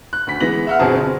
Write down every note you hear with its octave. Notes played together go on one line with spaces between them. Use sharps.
F#6
D2 B6
E3 G#3 B3 A#6 F#7
E5 F#5 F6
G1 B2 C4 G#4 A5
C4